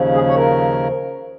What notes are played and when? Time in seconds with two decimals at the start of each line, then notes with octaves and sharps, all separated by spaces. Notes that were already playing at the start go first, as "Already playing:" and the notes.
Already playing: D#2 C#3 F3
0.13 G#4
0.27 C#5
0.35 A#4